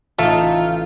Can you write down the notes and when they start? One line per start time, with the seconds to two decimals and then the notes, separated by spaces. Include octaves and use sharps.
0.19 A1 A3 D#4 F4